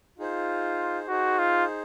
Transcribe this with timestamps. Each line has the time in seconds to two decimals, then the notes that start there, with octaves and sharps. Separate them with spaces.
0.19 D#4 F4 G#4 C5
1.09 D#4 F#4 G#4 C5
1.39 F4